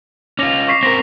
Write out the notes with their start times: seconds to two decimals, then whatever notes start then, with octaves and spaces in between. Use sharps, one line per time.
0.39 C#4 F4 D6 A#6 F7
0.68 C#6 B6 C7
0.83 C4 A#4 A#6